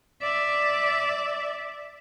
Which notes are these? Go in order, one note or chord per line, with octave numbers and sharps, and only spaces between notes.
D5 E5